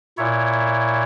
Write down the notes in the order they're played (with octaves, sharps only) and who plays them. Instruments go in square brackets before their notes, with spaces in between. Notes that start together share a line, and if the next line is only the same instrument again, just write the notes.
[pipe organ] A#2 E4 C#5